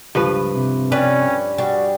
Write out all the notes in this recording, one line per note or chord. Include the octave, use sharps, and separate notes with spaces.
C#2 G2 F3 B4
C3
G3 C#4 B4
G3 F#4 G#4